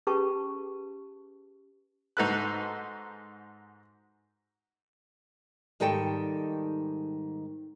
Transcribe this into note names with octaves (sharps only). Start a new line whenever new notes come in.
C#4 G4 G#4 B4 A5 C#6
G#2 D#4 F#4 A4 B4 F#6
G#2 D#3 G3 A4 G5 A5